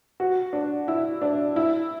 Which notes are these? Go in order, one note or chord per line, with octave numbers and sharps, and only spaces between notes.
F#4
D4
E4
D4
E4